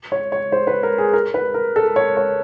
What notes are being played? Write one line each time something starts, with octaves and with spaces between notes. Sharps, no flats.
C#5
C#5
C5
B4
A#4
G#4
A#4
B4
A#4
A4
C#5
C#5